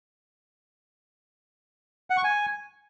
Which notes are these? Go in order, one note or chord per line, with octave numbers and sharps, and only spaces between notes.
F#5
C#6
G#5